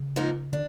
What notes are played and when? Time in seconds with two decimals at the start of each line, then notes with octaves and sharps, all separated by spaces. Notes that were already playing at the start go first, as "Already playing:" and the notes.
Already playing: C#3
0.16 G#2 F3 A#3 D#4
0.52 D3 D4